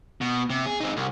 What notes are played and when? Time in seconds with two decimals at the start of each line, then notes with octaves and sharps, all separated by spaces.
0.21 B2
0.50 C3
0.66 G#4
0.80 C4 D#4
0.97 C2